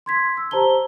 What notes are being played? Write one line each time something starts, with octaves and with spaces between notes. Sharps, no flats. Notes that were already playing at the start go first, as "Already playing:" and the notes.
C6 G#6 B6
E6
G4 C5 A5 A#5 G7